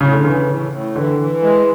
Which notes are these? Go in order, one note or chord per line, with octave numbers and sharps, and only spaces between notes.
A2 C#3
D3
C#3 E3
A2
A2
D3 E3
E3
G#3